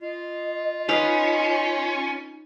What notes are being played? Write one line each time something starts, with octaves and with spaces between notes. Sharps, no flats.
F4 D#5
C#4 D#4 B4 C#5 F5